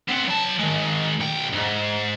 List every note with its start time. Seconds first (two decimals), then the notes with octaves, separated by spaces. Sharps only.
0.08 B3 C4
0.27 F#3 A5
0.59 D#3 G#3
1.20 B1 G5
1.52 F2 G#2